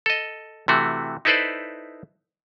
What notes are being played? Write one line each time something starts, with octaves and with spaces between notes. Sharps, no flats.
A4 D#5
C3 E3 A3 F#4
D#4 E4 A4 B4 C5 D5